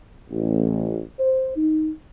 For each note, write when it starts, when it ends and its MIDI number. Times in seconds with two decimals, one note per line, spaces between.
0.30 0.99 33
1.19 1.56 72
1.57 1.90 63